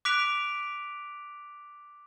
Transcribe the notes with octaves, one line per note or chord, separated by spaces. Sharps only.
D6 F#6 B6 D7 F7